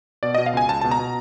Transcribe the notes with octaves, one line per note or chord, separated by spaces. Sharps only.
B2 D5
B2 D#5
F5
C#2 G#5
C#2 A5
B2 A5
A#5
B2